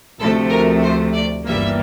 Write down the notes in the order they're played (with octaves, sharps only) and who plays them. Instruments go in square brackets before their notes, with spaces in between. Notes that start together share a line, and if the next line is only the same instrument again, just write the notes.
[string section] D2 C3 F3 A3 A4
A#4
C5
D5
G1 G2 E3 G3 A#3 E5